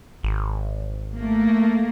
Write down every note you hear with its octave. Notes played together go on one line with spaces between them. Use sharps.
G#1
A3 A#3